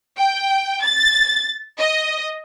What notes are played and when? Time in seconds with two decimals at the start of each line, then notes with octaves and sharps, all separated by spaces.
0.17 G5
0.83 A6
1.78 D#5